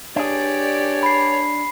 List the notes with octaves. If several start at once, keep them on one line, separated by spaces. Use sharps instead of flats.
D4 G4 G#4 C#5 D5
B5 C7